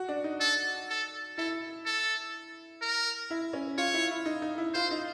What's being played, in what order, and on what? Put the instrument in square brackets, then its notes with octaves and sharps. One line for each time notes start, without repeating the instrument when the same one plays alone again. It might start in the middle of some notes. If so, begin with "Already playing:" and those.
Already playing: [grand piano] F#4
D4
D#4
[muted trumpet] A4
A4
[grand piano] E4 [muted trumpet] A4
[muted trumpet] A4
A#4
[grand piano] E4
C#4
[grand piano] F4 [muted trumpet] C#5
[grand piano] E4
E4
D#4
D#4
E4
[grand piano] F4 [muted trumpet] C5
[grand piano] D#4